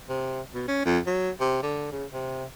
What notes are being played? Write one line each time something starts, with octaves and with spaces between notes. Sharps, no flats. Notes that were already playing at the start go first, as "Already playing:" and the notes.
C3
B2
C#4
F2
F#3
C3
D3
C#3
C3